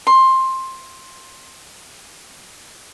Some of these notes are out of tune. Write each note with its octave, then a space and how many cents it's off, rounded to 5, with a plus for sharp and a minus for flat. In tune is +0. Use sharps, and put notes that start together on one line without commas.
C6 +15